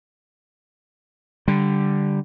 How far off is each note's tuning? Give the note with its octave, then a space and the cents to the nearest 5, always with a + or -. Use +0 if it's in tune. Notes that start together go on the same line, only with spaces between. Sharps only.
D3 +0 G3 +0